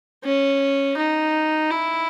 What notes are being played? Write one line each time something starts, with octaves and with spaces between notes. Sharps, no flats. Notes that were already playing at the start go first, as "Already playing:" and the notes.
C#4
D#4
E4